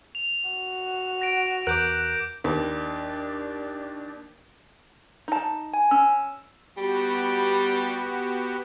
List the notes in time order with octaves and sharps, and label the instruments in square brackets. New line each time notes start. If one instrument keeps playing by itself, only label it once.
[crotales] F7
[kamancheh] F#4
[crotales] A#6 D7
[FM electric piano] E2 A#4 F#6 [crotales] D6 G6 D7
[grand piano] D#2 [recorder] D4
[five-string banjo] D#4 A5
[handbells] G#5
[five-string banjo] C#4 [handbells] E6
[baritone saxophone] G3 [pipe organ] B3 F#4 G4